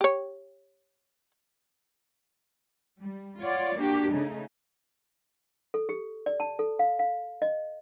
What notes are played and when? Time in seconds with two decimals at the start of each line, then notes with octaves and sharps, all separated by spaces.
0.01 G4 C#5
3.01 G3
3.42 F4 C#5 D5 F#5
3.78 A#3 D4 F#4 G4
4.10 C#3 A3 D#4
5.74 A4
5.89 G4
6.26 D5
6.40 A5
6.59 A4
6.79 F5
6.99 F5
7.42 D#5